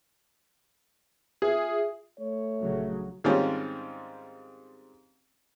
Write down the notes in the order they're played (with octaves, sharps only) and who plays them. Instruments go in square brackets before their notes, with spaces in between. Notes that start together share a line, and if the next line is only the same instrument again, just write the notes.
[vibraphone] F4 E5 [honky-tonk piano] G#4
[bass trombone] A3 [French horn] C#5
[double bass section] A#1 C#3 F#3
[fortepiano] G#2 D#3 G3 C4 C#4 F4